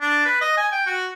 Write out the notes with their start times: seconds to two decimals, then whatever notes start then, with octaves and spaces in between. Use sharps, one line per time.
0.01 D4
0.25 B4
0.41 D#5
0.57 G#5
0.72 G5
0.86 F#4